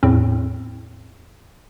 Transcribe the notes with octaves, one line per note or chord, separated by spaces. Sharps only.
E2 A2 C4